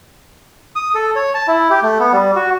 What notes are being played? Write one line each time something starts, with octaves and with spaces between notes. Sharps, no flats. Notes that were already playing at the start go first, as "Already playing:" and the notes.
D#6
A4
C#5
A5
E4
G4
A3
B3
G3
F#4